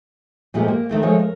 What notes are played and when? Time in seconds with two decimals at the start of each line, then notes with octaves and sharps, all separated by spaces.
0.54 A#2 F3 G#3 A3 B3 G4
0.68 A#3
0.89 D#3 A3 C4
1.03 F3 G#3 A3 A#4 C#5
1.19 A#4